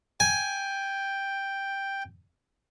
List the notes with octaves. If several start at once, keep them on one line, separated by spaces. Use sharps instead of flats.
G5 G#5